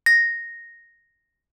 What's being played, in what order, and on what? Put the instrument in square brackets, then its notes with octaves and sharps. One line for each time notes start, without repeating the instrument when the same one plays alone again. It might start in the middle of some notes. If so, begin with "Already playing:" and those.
[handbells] A#6